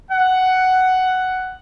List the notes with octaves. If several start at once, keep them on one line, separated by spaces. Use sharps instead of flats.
F#5